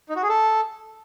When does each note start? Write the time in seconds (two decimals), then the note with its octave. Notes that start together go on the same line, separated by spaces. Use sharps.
0.09 D#4
0.16 F#4
0.22 G#4
0.29 A4